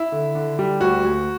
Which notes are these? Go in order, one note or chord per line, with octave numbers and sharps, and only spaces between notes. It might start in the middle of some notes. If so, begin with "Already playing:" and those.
Already playing: E4
D3
D3
G3
D2 F#4
D2